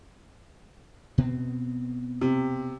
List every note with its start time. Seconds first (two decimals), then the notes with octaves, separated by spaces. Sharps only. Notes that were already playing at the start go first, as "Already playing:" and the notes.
1.18 B2 B3 C4
2.21 C3